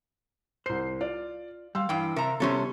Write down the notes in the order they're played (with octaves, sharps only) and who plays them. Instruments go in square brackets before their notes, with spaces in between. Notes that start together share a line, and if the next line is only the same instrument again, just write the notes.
[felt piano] C2 C7 [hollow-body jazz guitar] C5
[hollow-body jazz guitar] F4 [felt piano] D5
[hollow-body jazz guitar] G3 [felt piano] F5 C6 E6
[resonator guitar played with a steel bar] G2 G5 [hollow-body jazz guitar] E3
[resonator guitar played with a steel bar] C3 A#5 [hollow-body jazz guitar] A#4 E5
[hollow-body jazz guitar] C2 C#5 C6 [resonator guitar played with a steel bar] C3 C#4 A4 [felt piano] G3 B3